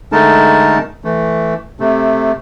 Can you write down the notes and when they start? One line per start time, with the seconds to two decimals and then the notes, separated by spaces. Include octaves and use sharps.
0.12 D3 G#3 A3 D#4 A#4 A5
1.04 E3 A3
1.80 C3 A3